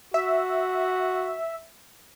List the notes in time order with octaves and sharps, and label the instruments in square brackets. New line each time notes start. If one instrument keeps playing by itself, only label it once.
[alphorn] F#4 [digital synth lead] E5